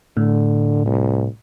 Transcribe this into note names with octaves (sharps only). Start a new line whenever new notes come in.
A2 D3
C2